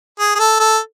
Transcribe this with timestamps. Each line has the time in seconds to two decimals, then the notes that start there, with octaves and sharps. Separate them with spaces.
0.20 G#4
0.35 G#4
0.39 A4
0.60 A4